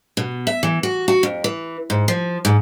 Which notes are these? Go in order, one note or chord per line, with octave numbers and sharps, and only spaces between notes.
B2
E5
E3
F#4
F#4
F2
E3
G#2
F3
G#2